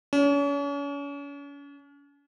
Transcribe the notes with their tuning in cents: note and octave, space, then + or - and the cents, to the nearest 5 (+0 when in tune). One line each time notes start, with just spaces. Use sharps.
C#4 +40